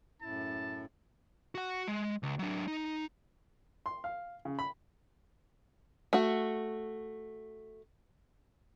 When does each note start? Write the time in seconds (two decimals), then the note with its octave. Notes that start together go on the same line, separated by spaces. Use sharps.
0.22 F#2 A2 E4 A5
1.55 F#4 F#5
1.87 G#3
2.23 C#2
2.39 F#3 D4
2.68 D#4
3.86 C6
4.04 F5
4.45 C#3
4.59 B5
6.13 A3 F#4